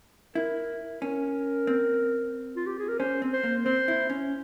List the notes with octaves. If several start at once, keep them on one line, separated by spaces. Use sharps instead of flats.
E4 A#4
C#4 A#4
C4
F4
G4
G#4
A#4
C#4 C5
C4
C5
A#3
C4 C5
E4
C#4